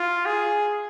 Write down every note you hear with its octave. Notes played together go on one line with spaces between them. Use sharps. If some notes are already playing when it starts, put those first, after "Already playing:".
Already playing: F4
G#4